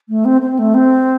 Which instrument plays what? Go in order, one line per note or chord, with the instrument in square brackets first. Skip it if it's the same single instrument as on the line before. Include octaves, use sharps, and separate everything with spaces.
[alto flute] A3
C4
C4
A3
C4